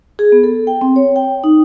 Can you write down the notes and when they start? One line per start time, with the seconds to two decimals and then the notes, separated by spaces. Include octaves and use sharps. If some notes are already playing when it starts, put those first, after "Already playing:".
0.19 G#4
0.32 B3
0.44 A4
0.67 G5
0.81 C4
0.96 C#5
1.16 G5
1.44 D#4